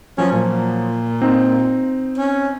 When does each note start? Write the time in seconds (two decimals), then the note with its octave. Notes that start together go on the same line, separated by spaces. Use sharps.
0.18 F3 F#3 C#4
0.32 A#2
1.22 C4 D#4
2.18 C#4